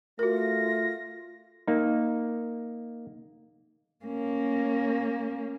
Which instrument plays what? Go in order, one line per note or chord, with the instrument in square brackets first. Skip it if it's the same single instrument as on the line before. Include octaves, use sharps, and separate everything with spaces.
[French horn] A3 [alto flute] F4 [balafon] F#4 A#4 [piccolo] A#6
[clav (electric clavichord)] A#3 D#4
[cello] A#3 C#4